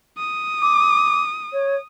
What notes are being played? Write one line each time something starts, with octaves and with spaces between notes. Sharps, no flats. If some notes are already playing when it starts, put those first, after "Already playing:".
D#6
D6
C#5